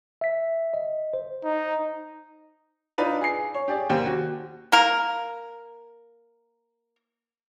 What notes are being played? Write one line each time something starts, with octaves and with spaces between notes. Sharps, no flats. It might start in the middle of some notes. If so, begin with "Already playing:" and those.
E5 B6
D#5
C5
D#4
D4 D#4 F4 B4 D5
G#4 C7
C#5
G4 G#4 D5
D#2 G4 C5
F#4
A#3 A#4